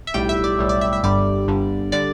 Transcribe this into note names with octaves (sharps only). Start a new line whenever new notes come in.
E5
B1 A2 G3 G5
E5
D5
B1 A2 G3
D5
E5
E5
G1 G2 D3 G3 D5
G1 G2 D3 G3
D3 G3 D5